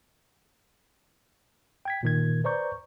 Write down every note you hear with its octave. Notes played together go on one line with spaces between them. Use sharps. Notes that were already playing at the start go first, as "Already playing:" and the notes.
G5 G#6 B6
A#2 D#3 G#6
B4 C5 D5 A#5 C#6 G6